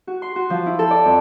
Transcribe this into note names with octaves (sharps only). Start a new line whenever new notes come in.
F#4
C6
F#4
F3
E4
A4
D5
F2